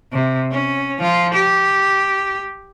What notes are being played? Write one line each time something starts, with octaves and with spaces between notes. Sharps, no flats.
C3
C#4
F3 F4
G4